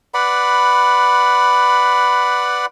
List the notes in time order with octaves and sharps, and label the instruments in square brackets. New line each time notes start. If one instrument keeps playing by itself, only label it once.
[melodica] B4 D5 F#5 B5